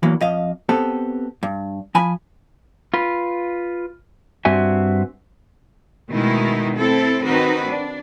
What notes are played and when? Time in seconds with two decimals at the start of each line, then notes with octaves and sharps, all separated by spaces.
0.03 E2 E3 F#3 A#3
0.21 F2 D#5 F5
0.69 B3 C4 G4 A4
1.43 G2
1.95 F3 G#5 B5
2.94 F4 B4
4.45 G2 C4 F#4 E5 G#5
6.12 B2 D#3 G#3 A3 D#4 E4
6.77 A3 C4 E4 A4
7.23 D#3 C4 D#4 F#4 B4
7.67 D4